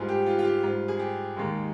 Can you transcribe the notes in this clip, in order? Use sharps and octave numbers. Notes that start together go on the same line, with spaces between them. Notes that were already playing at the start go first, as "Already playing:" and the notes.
Already playing: G#2 G3 F4 G#4
G4
F4
F4
G4
G#2 G3 F4
G#4
G4
D#2 D#3 G#3